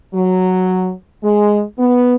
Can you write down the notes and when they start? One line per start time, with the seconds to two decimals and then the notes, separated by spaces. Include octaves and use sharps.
0.14 F#3
1.23 G#3
1.78 B3